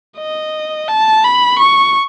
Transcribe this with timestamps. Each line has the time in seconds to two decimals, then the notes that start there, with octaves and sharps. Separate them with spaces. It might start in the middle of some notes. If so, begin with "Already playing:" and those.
0.18 D#5
0.89 A5
1.24 B5
1.59 C#6